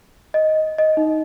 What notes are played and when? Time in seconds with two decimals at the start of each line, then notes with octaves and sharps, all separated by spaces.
0.34 D#5
0.78 D#5
0.97 D#4